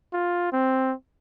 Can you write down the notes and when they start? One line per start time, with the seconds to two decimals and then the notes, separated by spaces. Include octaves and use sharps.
0.13 F4
0.53 C4